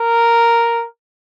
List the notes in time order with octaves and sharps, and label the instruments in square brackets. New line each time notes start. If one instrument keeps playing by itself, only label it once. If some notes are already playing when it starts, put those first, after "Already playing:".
Already playing: [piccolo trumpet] A#4